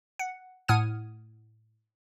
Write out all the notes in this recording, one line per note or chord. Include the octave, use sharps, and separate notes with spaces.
F#5
A2 F#5 D#6 F6 G#6 D#7